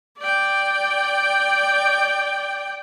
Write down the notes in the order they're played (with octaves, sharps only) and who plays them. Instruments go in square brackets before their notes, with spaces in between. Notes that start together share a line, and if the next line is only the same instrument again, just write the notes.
[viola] D5 G5